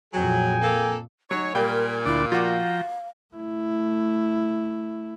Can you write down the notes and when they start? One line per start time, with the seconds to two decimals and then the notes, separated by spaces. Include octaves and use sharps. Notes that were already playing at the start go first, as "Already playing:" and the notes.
0.13 F2 A#2 F#3 G#4 G5 G#5
0.62 A#3 A4
1.31 F#3 D#4 C#5 G#5
1.55 A#2 G3 A#4 G5
2.06 D2 D4 E4 D5
2.32 F3 F4 F#4 F5 G5 A#5 D6
3.34 A3 E4